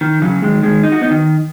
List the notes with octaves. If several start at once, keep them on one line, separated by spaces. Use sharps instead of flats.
D#3
C#3 F#3
D#3 G#3
D#3 G#3
D#4
F#4
B3 D#4
D#3